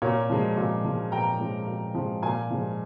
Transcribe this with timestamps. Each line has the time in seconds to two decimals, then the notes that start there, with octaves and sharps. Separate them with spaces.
0.02 A#2 A#4 C#5
0.30 F3 G#3
0.57 A#2
0.85 F3 G#3
1.12 A#2 G5 A#5
1.40 F3 G#3
1.67 A#2
1.95 F3 G#3
2.22 A#2 F5 G#5
2.51 F3 G#3